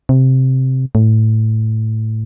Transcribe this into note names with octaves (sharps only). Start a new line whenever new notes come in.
C3
A2